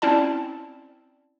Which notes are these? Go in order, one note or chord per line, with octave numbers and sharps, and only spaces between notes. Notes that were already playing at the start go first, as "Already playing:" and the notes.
C4 C#4 E4 D5 A5